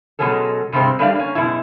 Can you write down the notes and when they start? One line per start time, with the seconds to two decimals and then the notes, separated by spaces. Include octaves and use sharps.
0.19 B2 F#3 G#3 C#4 A4
0.72 G2 C3 G3 G#3 C4
0.99 G3 A3 D4 G4 D5 F5
1.15 A#3 C#4
1.35 F#2 B2 G#3 E4